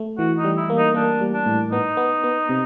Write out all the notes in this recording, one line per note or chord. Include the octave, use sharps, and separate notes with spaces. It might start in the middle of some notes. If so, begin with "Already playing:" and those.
Already playing: A3
E3 F#4
D#4
G3
E4
A#3
D#4
A#3 D4
G3
D4
A2
B3 D#4
B3
B3
C3